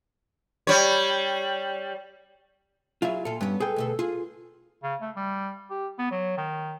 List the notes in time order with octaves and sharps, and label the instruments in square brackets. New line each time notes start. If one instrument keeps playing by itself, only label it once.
[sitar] G3 C#5
[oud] F#3 E4 G#4 [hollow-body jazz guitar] F4 E5
[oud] A#2 F4 [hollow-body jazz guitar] A4
[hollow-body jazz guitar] G2 [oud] B3 C#4
[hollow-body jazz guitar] G#4 B4 G5 [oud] A4
[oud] D2 B2 A4
[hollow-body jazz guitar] F4 [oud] G#4
[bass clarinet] C#3
A3
G3
G4
B3
F#3
D#3